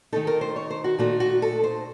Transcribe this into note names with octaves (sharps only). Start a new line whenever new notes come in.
D#3 A3 D#4 A4
A#4
C5
C#5
C5
F#4
A#2 A3 D#4 F#4
F#4
A4
C5